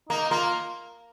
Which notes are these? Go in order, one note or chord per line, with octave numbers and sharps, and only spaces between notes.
A#3 D#4
A#3 F4